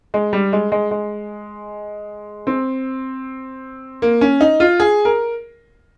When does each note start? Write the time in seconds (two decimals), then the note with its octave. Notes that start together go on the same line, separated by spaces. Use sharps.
0.14 G#3
0.33 G3
0.53 G#3
0.72 G#3
0.91 G#3
2.47 C4
4.02 A#3
4.21 C#4
4.41 D#4
4.60 F4
4.80 G#4
5.05 A#4